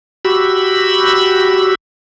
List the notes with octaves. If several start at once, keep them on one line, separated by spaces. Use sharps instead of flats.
F#4 G4 B5 E6